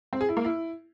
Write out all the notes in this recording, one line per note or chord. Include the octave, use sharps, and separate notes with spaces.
C4
G#4
E4
A#3
E4